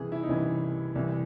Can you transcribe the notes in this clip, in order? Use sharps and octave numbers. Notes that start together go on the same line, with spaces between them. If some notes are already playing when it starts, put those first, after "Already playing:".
Already playing: C2 C3 E3 G#4
E4
D#4
C2 C3 E3 C#4
C2 C3 E3